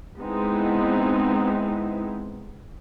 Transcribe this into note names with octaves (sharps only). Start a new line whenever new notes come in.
G#3 B3 C4 D#4 E4